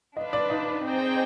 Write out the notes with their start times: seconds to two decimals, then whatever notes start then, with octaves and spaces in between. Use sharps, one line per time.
0.17 D4 F4 B4 D#5
0.33 D5
0.50 D#4
0.84 C4 D#4 G#4 C5 G5